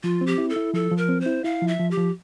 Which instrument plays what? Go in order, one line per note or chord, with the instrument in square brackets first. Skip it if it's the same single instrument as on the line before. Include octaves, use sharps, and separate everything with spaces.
[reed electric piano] F3 [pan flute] F4
[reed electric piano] C4
[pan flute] G4
[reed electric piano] E4
[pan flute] A4
[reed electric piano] E4
[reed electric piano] F3 [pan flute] A4
[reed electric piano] F3
[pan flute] A#4
[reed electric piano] C4
[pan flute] C5
[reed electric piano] E4
[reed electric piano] E4 [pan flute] F5
[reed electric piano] F3
[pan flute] E5
[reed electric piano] F3
[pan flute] G4
[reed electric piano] F3